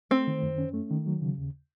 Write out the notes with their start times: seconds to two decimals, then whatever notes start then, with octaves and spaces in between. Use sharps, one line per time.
0.11 A3 C4
0.27 D#3
0.42 F#2
0.58 C#4
0.74 A3
0.91 D#3
1.06 F#3
1.21 C#3
1.38 D#2